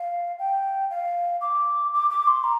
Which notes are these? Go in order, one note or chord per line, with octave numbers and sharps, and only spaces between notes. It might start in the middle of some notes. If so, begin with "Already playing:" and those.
Already playing: F5
G5
F5
D6
D6
D6
C6
A#5